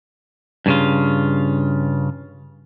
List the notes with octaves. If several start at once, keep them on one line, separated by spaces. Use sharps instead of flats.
G2 C#3 F4